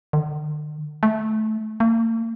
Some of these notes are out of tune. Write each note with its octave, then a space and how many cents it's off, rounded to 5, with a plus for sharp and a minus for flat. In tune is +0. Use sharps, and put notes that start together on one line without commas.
D3 +45
A3 -15
A#3 -45